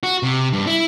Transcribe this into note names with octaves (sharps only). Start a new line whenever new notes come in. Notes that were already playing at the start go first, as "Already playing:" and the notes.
F#4
C3
G2
E4